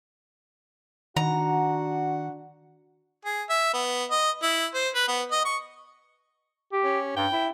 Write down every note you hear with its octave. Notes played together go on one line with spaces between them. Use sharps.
D#3 D4 F#4 F#5 A#5
G#4
E5
B3
D#5
E4
C5
B4
B3
D#5
C#6
G4
C#4
G2 G5
E4